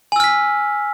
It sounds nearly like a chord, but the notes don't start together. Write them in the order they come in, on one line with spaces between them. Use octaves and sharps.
G#5 E6 F6 B6